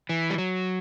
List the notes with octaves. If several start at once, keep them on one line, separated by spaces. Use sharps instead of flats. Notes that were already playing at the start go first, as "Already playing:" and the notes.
E3
G3
F#3